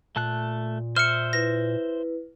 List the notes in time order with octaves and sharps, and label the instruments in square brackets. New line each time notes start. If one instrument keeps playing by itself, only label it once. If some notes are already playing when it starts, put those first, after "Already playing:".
[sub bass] A#2 [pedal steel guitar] A3 A5 F#6
[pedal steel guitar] C5 E5 [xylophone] F6 C#7
[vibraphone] E4 B4 [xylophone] A#6